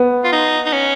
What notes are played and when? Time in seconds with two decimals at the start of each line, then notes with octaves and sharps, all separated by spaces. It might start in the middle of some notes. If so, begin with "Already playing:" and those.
Already playing: B3
0.24 F4
0.32 D#4
0.65 D#4
0.73 C#4